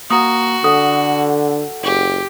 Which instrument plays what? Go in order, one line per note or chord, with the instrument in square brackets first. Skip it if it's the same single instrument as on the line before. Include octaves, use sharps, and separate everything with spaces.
[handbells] A#3 A#5 [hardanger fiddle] F#4 [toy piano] D#6
[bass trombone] D3 [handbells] A4 F#5 [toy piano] D#6
[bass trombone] F#1 [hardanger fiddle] G4